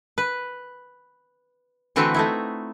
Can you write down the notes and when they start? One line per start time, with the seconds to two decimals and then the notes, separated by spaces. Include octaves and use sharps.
0.18 B4
1.96 D3 E3 A3 C4 F#4 B4
2.14 A3 D#4 E4